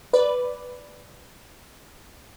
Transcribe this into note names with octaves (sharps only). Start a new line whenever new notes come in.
B4 D5